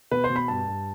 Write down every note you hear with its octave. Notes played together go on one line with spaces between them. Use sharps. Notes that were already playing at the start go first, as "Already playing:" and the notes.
B2 B4
C5
B2
B5
G2 A5
G2